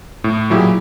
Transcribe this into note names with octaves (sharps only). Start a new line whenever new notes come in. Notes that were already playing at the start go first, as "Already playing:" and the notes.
A2
A#2 F#3 E4 G4 G#4